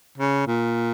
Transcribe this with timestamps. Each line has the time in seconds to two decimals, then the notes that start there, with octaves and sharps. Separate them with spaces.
0.18 C#3
0.47 A#2